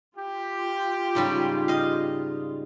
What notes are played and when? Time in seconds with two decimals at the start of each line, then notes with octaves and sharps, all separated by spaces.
0.17 F4 G4
1.15 G#2 C#3 G3
1.68 D#5 F5